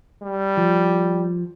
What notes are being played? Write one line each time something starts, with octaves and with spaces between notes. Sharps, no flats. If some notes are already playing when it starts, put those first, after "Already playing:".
G3
F3